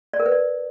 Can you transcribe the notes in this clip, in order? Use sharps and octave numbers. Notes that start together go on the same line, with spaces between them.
D5
A#4
B4
D5